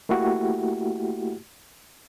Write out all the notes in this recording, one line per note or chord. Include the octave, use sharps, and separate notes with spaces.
A3 A#3 E4 F#4 G4